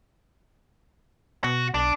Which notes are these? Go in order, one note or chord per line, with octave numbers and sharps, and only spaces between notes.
B2 F#4
B1 D4